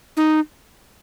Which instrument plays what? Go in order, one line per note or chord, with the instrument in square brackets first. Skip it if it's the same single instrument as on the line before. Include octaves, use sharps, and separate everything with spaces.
[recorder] D#4